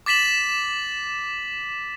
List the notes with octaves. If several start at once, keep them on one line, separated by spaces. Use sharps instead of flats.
D6 A6 B6 E7 F#7